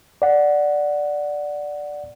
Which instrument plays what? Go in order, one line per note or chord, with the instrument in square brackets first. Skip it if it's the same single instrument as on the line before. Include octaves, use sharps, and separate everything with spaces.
[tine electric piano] D5 F#5